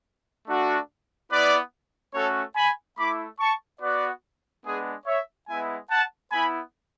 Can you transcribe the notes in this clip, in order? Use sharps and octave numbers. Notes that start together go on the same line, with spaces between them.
A3 D4 F#4
B3 E4 B4 D5
A3 C#4 F#4 A4 C#5
G#5 B5
A3 E4 B5 D6
A5 C#6
B3 F#4 B4 D5
G#3 B3 D4 G#4
C#5 E5
G#3 B3 E4 E5 G#5
F#5 A5
B3 E4 G#5 B5